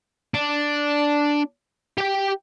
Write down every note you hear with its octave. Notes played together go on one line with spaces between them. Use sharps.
D4
G4 G5